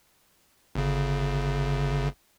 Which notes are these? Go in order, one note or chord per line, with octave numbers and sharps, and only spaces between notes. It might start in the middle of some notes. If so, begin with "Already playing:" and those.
G1 C#3